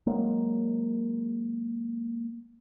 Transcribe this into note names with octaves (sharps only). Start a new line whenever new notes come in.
F#3 G#3 A#3